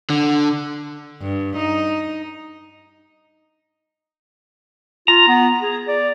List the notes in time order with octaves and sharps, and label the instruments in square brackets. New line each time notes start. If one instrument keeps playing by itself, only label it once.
[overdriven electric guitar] D3
[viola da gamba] G2
D#4
[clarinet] F4 [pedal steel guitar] A#5
[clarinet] B3
G#4
D5